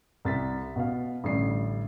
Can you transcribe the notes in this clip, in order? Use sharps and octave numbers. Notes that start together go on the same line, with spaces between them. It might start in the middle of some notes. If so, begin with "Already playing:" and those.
C2 A6 B6
B2 F5
A1 D3 G3 C7